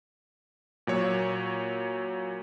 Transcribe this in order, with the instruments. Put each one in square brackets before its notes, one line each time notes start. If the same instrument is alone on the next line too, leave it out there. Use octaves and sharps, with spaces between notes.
[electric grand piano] A#2 F#3 C#5